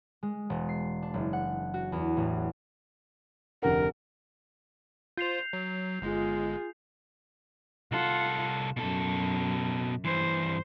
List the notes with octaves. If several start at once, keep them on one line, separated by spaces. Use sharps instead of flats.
G#3
E1
C7
D4
F#1
F#5
F#4
E2
A1
F1 D2 A#4 F#5
F4 C5 G6 C7 F7
F#3
G1 G#3 F4 G#4
C2 F4 A4 F#5
F#2 B2 A4
G2 E3 C5